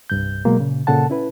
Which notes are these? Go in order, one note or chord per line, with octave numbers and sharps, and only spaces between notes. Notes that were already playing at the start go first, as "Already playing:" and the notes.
C2 G2 G6
B2 F#3 G#3 A#3
A#2 C#3
A#2 C#3 A4 F#5 A5
C#4 E4 B4